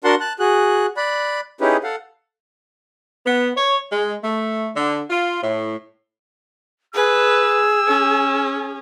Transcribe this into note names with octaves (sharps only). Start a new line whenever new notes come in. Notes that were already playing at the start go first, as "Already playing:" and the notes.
D4 F#4 A#4 F#5 A5 C6
A5 F#6
F#4 G#4 F#6
D5 B5 F#6
C#4 D#4 E4 G4 G#4 B4
A4 F5 F#5
B3
C#5
G#3
A3
D3
F4
A2
G#4 B4 E6
C#4